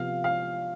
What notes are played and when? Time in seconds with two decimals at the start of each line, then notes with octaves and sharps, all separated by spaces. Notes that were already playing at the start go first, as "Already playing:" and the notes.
Already playing: C3 F3 B3 F4 F5
0.24 F5